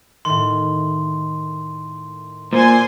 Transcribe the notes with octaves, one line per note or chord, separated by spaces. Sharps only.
A2 D#3 C6
A#2 C5 G#5 C6